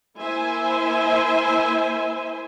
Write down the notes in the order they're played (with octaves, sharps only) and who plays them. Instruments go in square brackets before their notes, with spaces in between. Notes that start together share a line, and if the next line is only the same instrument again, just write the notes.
[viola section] A#3 E4 C5 E5 G#5